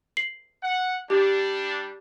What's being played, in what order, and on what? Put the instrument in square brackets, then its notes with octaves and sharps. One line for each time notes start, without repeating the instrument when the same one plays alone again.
[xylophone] C7 F#7
[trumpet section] F#5
[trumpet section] G3 D4 [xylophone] G4